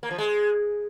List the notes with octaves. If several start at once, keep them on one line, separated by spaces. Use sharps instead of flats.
A#3
F3
G#3